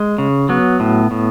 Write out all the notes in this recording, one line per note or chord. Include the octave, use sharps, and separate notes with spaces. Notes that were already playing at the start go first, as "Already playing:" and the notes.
Already playing: G#3
C#3
F#3 B3
A2
A2